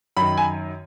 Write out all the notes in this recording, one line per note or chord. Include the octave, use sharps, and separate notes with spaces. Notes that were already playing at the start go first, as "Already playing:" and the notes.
F#2 D#3 B5
G#5